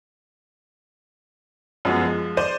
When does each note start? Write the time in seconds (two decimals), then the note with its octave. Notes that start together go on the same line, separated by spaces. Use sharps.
1.85 F#2 F3 G#3 B3 F#4
2.02 F3 G#3
2.37 C5 D5 D#7